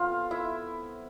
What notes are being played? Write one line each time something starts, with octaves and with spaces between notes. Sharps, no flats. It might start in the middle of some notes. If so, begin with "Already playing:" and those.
Already playing: F3 A3 B3 C4 F4 F5
E4 E5